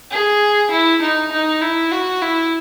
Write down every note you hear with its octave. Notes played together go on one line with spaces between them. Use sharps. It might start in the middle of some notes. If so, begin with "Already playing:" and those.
G#4
E4
D#4
D#4
E4
F#4
E4